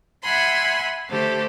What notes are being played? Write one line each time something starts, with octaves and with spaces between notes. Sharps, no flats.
E5 F#5 G#5 B5 C6
D3 A3 G4 A4 C5